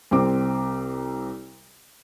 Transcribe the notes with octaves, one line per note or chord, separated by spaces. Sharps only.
C2 C4 D6